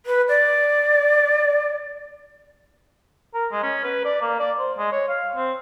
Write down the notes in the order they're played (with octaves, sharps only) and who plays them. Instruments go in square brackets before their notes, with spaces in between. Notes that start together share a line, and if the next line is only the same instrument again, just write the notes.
[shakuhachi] B4
D5
[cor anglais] A#4
G#3
C#4
B4
D5
A#3
D5
C5
G#3
C#5
F5
C4